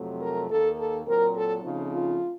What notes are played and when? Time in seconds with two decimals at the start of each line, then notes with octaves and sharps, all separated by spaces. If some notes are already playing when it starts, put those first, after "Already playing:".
Already playing: F2 C3 F#3 A3
0.21 A#4
0.49 D#2 D#3 A#3 A4
0.78 A4
1.06 A#2 F#3 C4 A#4
1.35 A4
1.63 C#3 F3 A3 C4 D#4 F4
1.92 F4